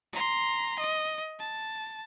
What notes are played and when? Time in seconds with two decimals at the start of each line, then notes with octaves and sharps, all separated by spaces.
0.13 A#5 C6
0.79 D#5
1.39 A5